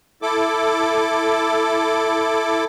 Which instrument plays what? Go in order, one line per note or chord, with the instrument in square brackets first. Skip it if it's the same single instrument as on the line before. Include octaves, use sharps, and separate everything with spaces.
[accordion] E4 A4 D6